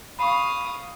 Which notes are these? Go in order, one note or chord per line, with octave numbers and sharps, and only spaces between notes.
F5 B5 C#6 D#6